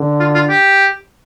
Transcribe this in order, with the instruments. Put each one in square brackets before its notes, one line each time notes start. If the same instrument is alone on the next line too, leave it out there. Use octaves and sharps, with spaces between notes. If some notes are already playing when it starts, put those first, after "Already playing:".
Already playing: [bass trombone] D3
[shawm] F4
F4
G4